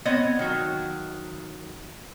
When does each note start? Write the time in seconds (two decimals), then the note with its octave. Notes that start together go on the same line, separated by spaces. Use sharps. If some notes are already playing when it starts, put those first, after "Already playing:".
0.05 B3 C4 C#5 D#5
0.39 D#3 F#3